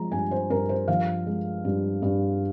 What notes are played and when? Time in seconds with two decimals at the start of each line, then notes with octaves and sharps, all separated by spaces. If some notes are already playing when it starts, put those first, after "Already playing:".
Already playing: F3 G#3 A#5
0.12 G2 G#5
0.31 C5
0.50 G2 A#4
0.69 C5
0.88 F3 F5
1.26 G#3
1.65 G2
2.02 G2